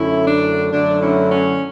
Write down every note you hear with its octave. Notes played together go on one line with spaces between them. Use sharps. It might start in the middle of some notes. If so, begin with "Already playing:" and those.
Already playing: F#2 D3 A3 C#4 E4
D4
F#2 D3 F#3 A3 D4
C#4 E4
C#4